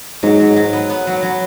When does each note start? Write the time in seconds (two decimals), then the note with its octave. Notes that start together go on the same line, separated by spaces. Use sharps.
0.23 G#2 F#3
0.40 F#3
0.56 F#3
0.73 B3
0.90 B3
1.07 F#3
1.22 F#3